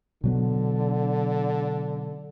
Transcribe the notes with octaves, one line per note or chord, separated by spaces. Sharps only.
B2 D3 F#3 B3